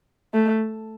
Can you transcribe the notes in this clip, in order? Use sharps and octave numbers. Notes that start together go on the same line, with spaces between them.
A3